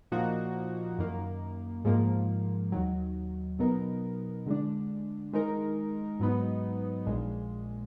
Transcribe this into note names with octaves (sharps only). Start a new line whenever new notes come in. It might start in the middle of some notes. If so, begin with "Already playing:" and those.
A#2 F3 A#3 D#4 F#4
F#2 D#3 A#3
G#2 F3 A#3
D#2 D#3 F#3
B2 F#3 B3 D#4 A#4
D3 G#3 D4
D#3 G#3 D#4 A#4
G#2 F#3 B3 D#4
A#1 A#2 G#3